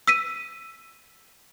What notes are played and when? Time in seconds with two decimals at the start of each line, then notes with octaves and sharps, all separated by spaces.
0.07 E6 B6 D#7